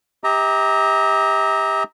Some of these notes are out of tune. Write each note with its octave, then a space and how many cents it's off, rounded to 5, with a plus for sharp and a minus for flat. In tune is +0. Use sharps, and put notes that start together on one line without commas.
G4 +15 E5 -45 A#5 +0